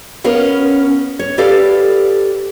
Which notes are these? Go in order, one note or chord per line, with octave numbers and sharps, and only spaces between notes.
B3 C#4 A#4 F5
C#5
G4 A4 B4 D5 F5